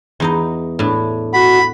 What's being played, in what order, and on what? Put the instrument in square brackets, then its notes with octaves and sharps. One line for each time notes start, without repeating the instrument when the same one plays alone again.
[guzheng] E2 D#4 D#5
A2 D4
[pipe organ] F#4 [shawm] B5